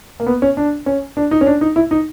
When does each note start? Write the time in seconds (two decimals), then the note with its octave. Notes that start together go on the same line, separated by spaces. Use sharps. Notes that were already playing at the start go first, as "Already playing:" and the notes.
0.20 A#3
0.27 B3
0.42 C#4
0.57 D4
0.86 C#4
1.17 D4
1.31 D#4
1.41 C#4
1.46 D4
1.61 D#4
1.76 E4
1.91 D#4